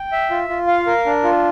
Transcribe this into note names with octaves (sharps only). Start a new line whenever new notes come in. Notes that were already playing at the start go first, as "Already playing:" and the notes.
Already playing: G5
E5
F4
F4
F5
A#4
D4
F4